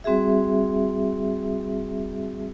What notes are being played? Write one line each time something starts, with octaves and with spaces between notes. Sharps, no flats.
G3 C4 F#4 G#4 E5